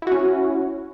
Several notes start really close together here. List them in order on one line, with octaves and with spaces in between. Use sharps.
E4 F#4 C#4